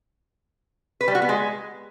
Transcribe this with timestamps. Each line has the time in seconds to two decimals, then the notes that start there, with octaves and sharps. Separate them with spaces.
1.01 B4
1.08 G3
1.15 F#4
1.22 B3
1.29 G#3